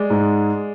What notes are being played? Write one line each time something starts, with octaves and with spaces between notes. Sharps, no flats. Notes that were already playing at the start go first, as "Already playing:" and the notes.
Already playing: G#3 D5
G#2